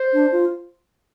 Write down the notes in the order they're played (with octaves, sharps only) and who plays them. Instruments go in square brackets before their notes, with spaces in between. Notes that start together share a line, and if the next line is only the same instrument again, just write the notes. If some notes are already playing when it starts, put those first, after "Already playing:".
Already playing: [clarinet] C5
[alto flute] D4
F4